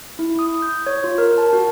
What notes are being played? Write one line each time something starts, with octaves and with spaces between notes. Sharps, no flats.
E4
D#6
G6
C#5
F4
A#4
A5
F#4